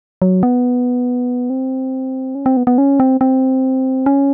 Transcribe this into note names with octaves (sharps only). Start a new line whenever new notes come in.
F#3
B3
C4
C#4
C4
B3
B3
C#4
C4
C4
C#4